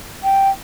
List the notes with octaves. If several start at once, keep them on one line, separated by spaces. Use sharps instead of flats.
G5